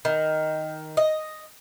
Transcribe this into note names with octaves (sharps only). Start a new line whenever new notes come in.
D#3
D#5